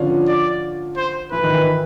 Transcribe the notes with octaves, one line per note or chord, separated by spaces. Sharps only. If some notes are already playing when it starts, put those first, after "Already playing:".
Already playing: D3 F3 C#4 D4 F4
D5
C5
E3 E4 B4
D#3 D#4
E3 E4